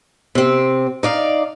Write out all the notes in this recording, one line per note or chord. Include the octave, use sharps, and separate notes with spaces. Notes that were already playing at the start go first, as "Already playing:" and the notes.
C3 C4
D#4 D5 F5